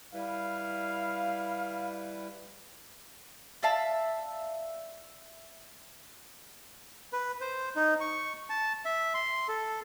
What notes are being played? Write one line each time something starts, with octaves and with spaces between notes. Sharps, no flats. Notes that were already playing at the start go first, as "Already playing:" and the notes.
G3 E4 B4 F5
D5 E5 F5 A5
B4
C5
D#4
C#6
A5
E5
C6
A4